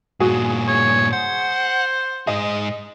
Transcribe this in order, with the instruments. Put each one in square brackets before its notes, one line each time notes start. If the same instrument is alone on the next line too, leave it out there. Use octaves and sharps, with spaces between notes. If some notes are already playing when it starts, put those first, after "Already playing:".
[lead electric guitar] G2 A#2 [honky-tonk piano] F#4 G#4
[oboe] C#5
[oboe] C5 [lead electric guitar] F#5
[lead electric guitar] G#2 G#4 [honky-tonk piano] D#5